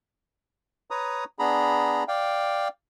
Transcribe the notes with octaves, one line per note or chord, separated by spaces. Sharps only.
B4 C#5 A#5 D#6
B3 D4 G#4 A#5 B5
D5 F5 G5